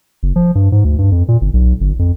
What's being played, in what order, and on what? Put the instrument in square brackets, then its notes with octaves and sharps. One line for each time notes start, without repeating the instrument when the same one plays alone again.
[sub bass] F#1
F3
G2
G#2
D2
G2
F2
A#2
G1
B1
G1
F2